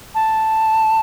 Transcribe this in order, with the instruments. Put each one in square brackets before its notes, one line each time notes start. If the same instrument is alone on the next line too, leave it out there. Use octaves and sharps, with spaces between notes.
[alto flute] A5